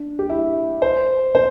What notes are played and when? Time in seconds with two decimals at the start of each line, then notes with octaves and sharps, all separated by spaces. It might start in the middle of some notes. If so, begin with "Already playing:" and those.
Already playing: D4
0.19 G4
0.30 E4
0.82 C5
1.35 C5